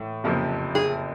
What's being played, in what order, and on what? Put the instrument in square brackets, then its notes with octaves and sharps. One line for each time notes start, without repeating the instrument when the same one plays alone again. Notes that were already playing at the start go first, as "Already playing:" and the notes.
Already playing: [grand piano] A2 E3
F#1 F2 C3 F3
[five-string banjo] G#4